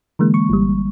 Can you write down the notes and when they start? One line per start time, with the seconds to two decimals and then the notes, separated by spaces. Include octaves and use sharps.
0.19 D3 E3 G#3 A#3
0.34 C#6
0.49 G#1 G3